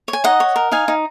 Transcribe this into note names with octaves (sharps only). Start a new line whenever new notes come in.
C#5
G#5
D#4 D#5 F#5
C#5
A#4
D#4 F5 G#5
D#4